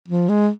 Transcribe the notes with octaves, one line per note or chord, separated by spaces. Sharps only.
F3
G#3